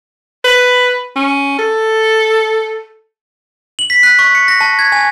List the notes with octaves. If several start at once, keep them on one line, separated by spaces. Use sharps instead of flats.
B4
C#4
A4
F#7
B6
F#6
C#6
C#7
A#6
A5
G#6
G#5